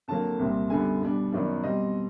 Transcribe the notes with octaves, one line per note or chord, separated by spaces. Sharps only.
F2 D3 F#3 A#3 A5
C2 A#2 G3 C4
F#2 D3 G3 B3 G#5
B2 G3 B3 D4
F#2 D#3 F#3 B3 D5
B2 G3 C4 D#5